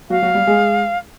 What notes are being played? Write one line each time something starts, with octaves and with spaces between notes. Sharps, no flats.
F#3 F#4 F5
F#3 F#4
G3 G4
G#3 G#4